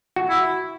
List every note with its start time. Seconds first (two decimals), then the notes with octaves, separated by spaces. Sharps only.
0.16 F#4
0.29 E4